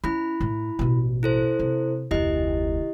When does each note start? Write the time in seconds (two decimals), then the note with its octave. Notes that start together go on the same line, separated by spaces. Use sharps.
0.04 C#4 E4 B5
0.41 A2
0.79 A1 B2
1.23 E4 A4 C5
1.59 C3
2.11 F1 D2 E4 G4 D#5